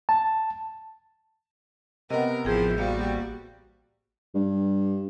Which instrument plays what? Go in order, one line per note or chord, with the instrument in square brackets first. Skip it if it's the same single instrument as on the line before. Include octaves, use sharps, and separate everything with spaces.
[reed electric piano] A5
[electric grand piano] C3 B3 [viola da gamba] A#4 [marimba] D#5 F#5
[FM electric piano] A1 G6 [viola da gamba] F3 E4 [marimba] G#4 G5
[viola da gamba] G3 F#4 [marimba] A#3 C5 F5
[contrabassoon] G2